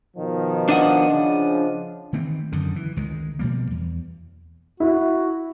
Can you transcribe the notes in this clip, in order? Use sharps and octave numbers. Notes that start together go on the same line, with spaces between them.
B2 D#3 F3
D4 D#5 F#5
C#3 F3
D#3 E3 A3 C4
F#2 D3 D#3
E3
C#2 D#3 G#3
B2 F3 G3 A#3
E2
E4 F#4